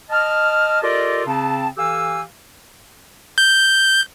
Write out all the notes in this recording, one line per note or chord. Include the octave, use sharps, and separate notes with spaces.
D#5 A5 F6
F4 G4 A4 A#4 D5 D#5
C#3 C4 A5
E3 G4 A4 F5 G#5 E6
G6